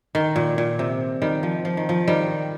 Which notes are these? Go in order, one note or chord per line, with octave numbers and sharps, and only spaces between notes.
D#3
A#2
A#2
C3
D#3 G3
F3
F3
D#3
F3
D#3 G3